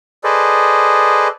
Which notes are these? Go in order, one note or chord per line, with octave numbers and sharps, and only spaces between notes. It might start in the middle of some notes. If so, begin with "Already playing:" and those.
G#4 A4 B4 C5 D5 D#5